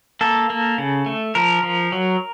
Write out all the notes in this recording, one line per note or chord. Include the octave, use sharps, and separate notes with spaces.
A#3 A4
A#3
C#3
A3
F3 A#4
F3
F#3